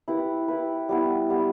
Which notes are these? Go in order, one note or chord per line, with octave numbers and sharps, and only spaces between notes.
E4 G4 B4
E4 G4 B4
G3 B3 E4
G3 B3 E4